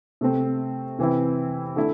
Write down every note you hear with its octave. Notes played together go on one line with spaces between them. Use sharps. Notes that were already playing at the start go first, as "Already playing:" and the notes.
C3 A3 C4
C3 E3 C4 E4
D3 A3 E4